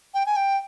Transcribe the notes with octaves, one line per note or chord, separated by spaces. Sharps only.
G5
G#5
G5